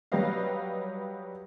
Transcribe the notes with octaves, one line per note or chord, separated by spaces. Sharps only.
F#3 G3 G4 B4 D#5 F5